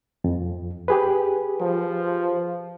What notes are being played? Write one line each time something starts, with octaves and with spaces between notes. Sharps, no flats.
F2
G4 G#4 B4
F3